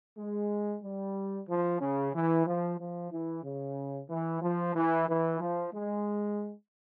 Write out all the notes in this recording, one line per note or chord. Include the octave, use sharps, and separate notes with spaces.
G#3
G3
F3
C#3
E3
F3
F3
E3
C#3
E3
F3
E3
E3
F3
G#3